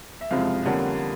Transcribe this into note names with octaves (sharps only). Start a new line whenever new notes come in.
E5
F#1 F2 C3 F3 G#3 F5
F2 D3 G3 A#3 C#4 F#5